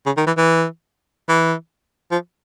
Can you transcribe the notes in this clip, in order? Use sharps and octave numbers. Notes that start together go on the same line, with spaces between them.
C#3
D#3
E3
E3
E3
F3